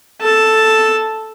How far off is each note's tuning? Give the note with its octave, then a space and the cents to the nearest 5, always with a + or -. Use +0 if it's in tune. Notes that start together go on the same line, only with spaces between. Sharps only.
A4 +0 A5 +0